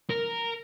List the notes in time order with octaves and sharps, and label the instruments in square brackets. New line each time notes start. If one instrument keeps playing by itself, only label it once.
[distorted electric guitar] A#4